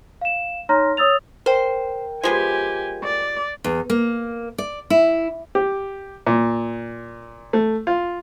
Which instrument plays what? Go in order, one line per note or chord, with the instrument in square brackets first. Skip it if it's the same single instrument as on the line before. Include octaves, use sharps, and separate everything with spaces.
[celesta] F5 E7
D#4 C#5 A#5 C6 F6 A#6
C#5 D#6 E6 A6 F7
[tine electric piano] A#4 G5 [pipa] C5
[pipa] F3 G#3 B3 [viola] G4 G#5
[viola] D5
[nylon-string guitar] E2
A#3
D5
E4
[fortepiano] G4
A#2
A3
F4